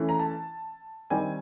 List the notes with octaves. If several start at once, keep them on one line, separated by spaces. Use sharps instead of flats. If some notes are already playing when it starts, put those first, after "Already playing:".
Already playing: E3 A3 C#4
A#5
A5
D#3 G3 C4 G#5